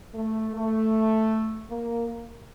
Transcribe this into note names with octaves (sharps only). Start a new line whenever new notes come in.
A3
A3
A#3